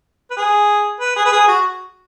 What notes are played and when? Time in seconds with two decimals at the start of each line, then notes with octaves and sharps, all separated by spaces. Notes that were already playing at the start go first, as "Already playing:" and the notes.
0.31 B4
0.37 G#4
1.00 B4
1.16 G#4
1.25 B4
1.32 G#4
1.48 F#4